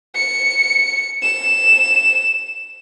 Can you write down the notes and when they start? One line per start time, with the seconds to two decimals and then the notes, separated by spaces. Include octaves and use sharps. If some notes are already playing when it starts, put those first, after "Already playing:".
0.16 C#7
1.23 E7